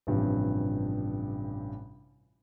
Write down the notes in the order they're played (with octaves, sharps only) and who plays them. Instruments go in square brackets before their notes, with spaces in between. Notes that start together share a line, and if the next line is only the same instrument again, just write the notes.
[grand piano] A1 G2 C3 F3